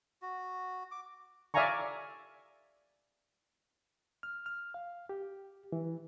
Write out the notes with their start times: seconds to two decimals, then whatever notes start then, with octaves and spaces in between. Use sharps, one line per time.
0.22 F#4
0.91 D6
1.54 D5 E5 F5 G#5 A#5 C#6
4.23 F6
4.46 F6
4.74 F5
5.09 G4
5.72 E3